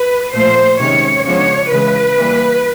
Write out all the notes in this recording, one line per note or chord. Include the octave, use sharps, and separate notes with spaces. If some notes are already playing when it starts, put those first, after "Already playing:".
Already playing: B4
A#2 F3 A3 C5
C3 D#3 G#3 C#4 C#5
C#3 F3 G#3 B3 D4 C#5
C#3 E3 G#3 B4
E3 G3 A#3